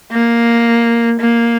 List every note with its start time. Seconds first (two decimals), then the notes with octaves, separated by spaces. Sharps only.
0.12 A#3
1.20 A#3